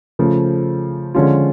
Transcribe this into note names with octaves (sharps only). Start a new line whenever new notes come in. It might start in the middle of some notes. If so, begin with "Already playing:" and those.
C#3 F3 A3
D3 F3 G#3 C#4 F4